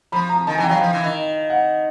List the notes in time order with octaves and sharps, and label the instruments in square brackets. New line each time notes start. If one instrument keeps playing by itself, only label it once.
[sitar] F3 [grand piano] B5
[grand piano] A#5
[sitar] D#3 [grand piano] A5
[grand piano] G#5
[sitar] E3
[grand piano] G5
[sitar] F#3 [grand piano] F5
[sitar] F3
E3
D#3
[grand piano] F#5